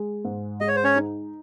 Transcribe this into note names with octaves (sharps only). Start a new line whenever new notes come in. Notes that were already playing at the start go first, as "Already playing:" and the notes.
Already playing: G#3
G#2
G#3 D#5
C#5
C5
C#4 C#5
D#4